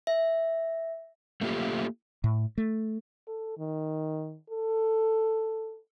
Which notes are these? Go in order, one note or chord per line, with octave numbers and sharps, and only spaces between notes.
E5
A3 A#3 F4 G4
A2
A3
A4
D#3
A4